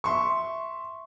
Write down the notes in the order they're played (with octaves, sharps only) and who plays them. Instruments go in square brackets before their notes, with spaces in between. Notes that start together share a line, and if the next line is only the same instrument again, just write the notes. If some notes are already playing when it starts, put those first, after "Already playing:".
[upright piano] E5 C6 C#6